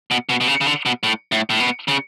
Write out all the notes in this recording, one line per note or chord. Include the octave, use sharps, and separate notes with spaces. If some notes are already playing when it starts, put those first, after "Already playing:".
B2
B2
B2
C#3
C#3
D3
B2
A2
A2
A2
B2
C#3